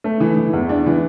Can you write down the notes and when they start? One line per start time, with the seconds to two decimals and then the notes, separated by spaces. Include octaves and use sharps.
0.04 A3
0.20 E3
0.37 E3
0.53 E2
0.69 D4
0.86 E3